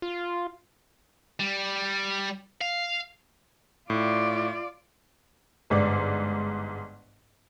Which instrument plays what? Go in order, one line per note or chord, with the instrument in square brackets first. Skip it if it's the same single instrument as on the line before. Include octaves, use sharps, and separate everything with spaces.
[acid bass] F4
[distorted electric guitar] G3
F5
[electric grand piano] A2 [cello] F4 D5
[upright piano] G1 G#2 D5